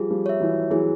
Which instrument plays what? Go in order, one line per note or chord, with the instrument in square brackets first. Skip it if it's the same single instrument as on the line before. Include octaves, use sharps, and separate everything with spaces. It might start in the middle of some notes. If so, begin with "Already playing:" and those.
Already playing: [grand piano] F3 G3 [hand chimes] G#4
[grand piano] F3 G3
[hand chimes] C#5 E5
[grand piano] E3 F#3
[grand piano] E3 F#3 [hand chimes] G#4